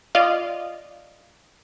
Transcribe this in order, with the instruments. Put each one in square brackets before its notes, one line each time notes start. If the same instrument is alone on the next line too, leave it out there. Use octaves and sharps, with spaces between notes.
[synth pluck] F4 D5 D#5 F5